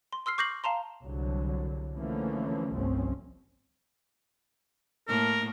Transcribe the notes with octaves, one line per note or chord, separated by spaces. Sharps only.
C6
C6 E6 F6 C7
C#6 D6 G6 A#6 C7 F#7
F5 A5 A#5 C6
C2 D3 F#3
D3 E3 F3 A3 A#3 C#4
G1 C2 F3 C4 C#4
A2 A#3 A#4